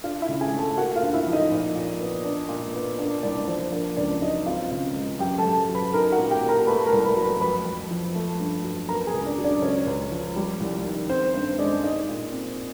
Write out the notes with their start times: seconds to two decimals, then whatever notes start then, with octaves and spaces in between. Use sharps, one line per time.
0.04 D4 F4 F5
0.22 E4 E5
0.28 C#3
0.40 G#4 G#5
0.52 A3
0.58 A4 A5
0.77 A#3 F#4 F#5
0.95 F4 F5
1.02 D2
1.14 E4 E5
1.26 F3
1.33 D#4 D#5
1.51 A#2
1.75 A#2
2.00 B3
2.24 D4
2.49 A#2
2.74 B3
2.98 A#3 D4 D5
3.23 C2 D4 D5
3.48 F3 C5
3.72 A#3 D4 D5
3.97 C#2 D4 D5
4.21 F#3 D#4 D#5
4.46 C4 F4 F5
4.71 C#3
4.96 G#3
5.19 F#2 G4 G5
5.38 A4 A5
5.44 F#2
5.69 F#3
5.75 B4 B5
5.93 D#4 A#4 A#5
6.12 F#4 F#5
6.18 A#2
6.30 G4 G5
6.42 A#3
6.49 A#4 A#5
6.67 A3 B4 B5
6.86 A#4 A#5
6.92 C2
7.04 B4 B5
7.16 F#3
7.23 B4 B5
7.41 F2 B4 B5
7.66 F2
7.90 F3
8.15 A3
8.39 G2
8.64 F#3
8.88 B3 A#4 A#5
9.07 G#4 G#5
9.14 C#2
9.25 D4 D5
9.38 F#3
9.44 D4 D5
9.62 C#2 C#4 C#5
9.86 C#2
10.12 F3
10.36 G3
10.60 C2
10.85 D#3
11.09 C4 C5
11.34 G2 C5
11.58 G#3 D4 D5
11.83 D#4 D#5
12.09 A#2
12.32 C4